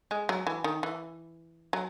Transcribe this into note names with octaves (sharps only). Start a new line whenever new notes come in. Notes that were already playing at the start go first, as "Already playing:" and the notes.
G#3
F#3
E3
D#3
E3
F#3